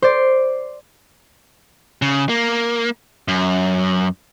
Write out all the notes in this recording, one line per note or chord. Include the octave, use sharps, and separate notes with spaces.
C5 D5
C#3
A#3
F#2